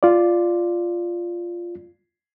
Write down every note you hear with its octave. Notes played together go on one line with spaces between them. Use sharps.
F4 D5